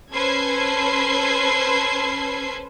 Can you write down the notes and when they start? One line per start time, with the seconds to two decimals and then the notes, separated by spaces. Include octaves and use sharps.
0.12 C#4 A4 B4 C5 G#6 C7